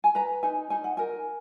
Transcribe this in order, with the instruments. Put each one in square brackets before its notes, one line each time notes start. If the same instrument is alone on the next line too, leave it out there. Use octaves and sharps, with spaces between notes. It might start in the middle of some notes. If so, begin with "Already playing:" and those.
[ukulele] G#5
B4 A#5
D#4 G#5
D#4 G#5
F#5
A#4 G#5